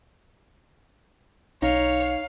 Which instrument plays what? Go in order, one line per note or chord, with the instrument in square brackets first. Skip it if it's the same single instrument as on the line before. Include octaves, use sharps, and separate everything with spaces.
[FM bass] B1 [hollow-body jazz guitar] D#4 [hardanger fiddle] C#5 [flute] F5